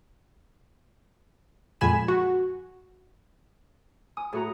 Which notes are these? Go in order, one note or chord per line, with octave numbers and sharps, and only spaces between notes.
F2 A#2 G#3 G#5 B5 E7
F#4
G#5 D#6
A2 F#4 G#4 A4 A#5 D#6